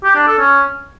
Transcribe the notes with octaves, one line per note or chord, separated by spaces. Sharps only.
G4
D4
A4
C#4